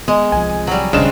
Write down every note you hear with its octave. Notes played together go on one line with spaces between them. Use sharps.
G#3 B3 D#5
C2 C3 F3 G#5
F#3 G3
D#1 C2 C#3 G#3 C4 D4 G#4 E7